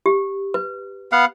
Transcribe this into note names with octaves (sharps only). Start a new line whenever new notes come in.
G4
B4
B3 F5 F#5